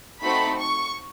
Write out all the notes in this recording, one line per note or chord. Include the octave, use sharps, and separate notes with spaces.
A3 C4 D#4 F#4 A4 B5
C#6